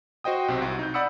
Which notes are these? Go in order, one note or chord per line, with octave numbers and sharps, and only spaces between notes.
F#4 C5 D#5 G5 D#6
B1 C3 C4
C2 F#4
D#4 G6
D5 F#5 B5 D#6 E6 C#7